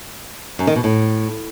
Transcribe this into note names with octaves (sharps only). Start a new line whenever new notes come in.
F#2
D#3
B2
A2